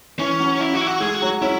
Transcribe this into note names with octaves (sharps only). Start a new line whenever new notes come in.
E3 C#4
F#3
E4
F#4
E4
F#4
G#3 G#4
F#4
F#3
C#4 E4